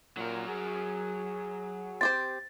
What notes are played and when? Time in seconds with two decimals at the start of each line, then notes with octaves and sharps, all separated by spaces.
0.17 A#2 F#3 A#4
0.48 G#4
2.01 C4 G4 C5 A6